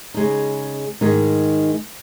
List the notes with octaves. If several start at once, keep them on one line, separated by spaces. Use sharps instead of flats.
C#3 G#3 D#4
G#2 D#3 G#3 D#4